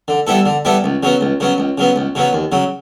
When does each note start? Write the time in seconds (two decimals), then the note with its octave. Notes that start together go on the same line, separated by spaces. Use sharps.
0.08 D3
0.27 G3 B3 E4 A4
0.46 D3
0.65 G3 B3 E4 A4
0.84 C#2
1.03 C#3 F#3 B3
1.21 C#2
1.40 C#3 F#3 B3
1.58 C#2
1.78 C#3 F#3 B3
1.96 C#2
2.15 C#3 F#3 B3
2.33 D#2
2.52 C#3 F#3